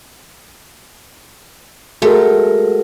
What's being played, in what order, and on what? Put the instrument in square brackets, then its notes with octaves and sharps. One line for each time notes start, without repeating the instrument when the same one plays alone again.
[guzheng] G#3 A3 [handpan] F#4 A#4